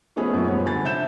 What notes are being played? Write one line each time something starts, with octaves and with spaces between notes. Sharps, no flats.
F3 A3 B3 C#4 G#4 D#5
F#2 A#2
F3 G3 B3 C#5
D3 G#5 B5 A6
C3 D4 E5 G6 E7